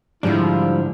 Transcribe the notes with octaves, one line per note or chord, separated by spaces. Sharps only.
G#2 D3 F3 G3 D4 E4